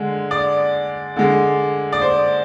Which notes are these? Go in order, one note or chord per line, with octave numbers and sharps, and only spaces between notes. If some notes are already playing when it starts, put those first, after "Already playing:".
Already playing: D3 G#3
D5
D3 G#3
D5
C5